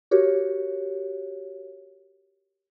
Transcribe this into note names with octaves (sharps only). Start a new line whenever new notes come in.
F#4 G4 A#4 C#5